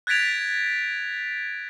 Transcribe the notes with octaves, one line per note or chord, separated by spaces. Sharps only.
F#6 G#6 A6 B6 D7 F7